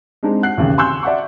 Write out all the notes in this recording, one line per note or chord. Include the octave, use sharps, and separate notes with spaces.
G#3 C4 D4 D#4
F#5 F#6 C7
A1 D#2 C#3
G#5 C6 C#6 E6 F#6 G6
D5 E5 F#5 C#6